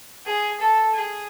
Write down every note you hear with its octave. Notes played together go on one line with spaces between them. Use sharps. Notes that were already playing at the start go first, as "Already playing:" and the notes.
G#4
A4
G#4